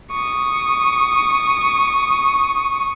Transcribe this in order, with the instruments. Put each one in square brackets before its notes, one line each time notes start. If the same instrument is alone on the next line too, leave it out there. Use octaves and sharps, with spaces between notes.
[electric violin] C#6 D#6